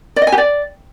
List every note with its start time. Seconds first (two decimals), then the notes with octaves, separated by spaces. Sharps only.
0.16 D5
0.22 D#5
0.27 G#5
0.32 G4
0.38 D5